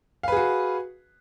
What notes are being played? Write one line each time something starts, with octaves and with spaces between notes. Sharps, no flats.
F#4 G#4 B4 F5